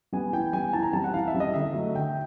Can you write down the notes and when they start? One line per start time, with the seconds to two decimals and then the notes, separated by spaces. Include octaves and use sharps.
0.12 G3 B3 G#5
0.33 E3 G5
0.53 G3 B3 G#5
0.73 E3 A5
0.83 A#5
0.93 G3 C4 A5
1.04 F#5
1.13 E3 F5
1.28 E5
1.34 G3 C4
1.40 D#5
1.54 D3 E5
1.74 F#3 A3
1.95 D3 G5